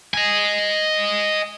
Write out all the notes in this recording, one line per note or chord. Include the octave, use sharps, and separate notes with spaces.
D#5 G#5